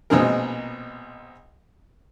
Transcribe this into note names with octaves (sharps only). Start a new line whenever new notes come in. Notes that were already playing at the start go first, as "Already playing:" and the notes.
A#1 B2 G#3 C4 G#4 A#4